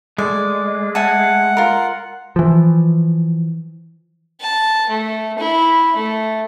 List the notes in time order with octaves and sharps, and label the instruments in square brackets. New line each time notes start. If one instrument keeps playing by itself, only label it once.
[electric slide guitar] G#3 A3 [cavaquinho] D5
[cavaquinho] E5 G#5 A5 [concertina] F#5
[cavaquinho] F4 A#4
[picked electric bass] E3 F3
[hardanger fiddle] A5
A3
E4
A3